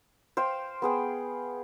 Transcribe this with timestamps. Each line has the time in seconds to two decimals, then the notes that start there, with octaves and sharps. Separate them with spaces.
0.37 C5 F5 G5
0.82 B3 G#4 G5